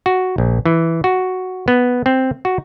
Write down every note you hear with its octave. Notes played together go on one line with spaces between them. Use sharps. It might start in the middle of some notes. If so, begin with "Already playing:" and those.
F#4
A#1
E3
F#4
B3
C4
F#4